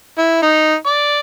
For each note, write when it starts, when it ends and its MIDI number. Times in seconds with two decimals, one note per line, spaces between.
0.18 0.41 64
0.42 0.74 63
0.86 1.20 74